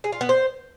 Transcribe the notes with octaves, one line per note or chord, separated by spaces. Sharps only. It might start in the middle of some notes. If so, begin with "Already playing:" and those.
G#4
F4
B3
C5